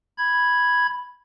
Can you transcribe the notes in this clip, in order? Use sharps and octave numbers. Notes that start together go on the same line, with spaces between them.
B5 G#6